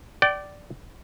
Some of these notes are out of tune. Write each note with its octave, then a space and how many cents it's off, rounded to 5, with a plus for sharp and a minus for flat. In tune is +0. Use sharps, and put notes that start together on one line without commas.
D5 +0 G5 -35